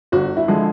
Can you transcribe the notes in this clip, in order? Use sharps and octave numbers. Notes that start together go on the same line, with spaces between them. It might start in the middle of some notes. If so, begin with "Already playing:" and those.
G1 F#4
E4
D3 F3 G#3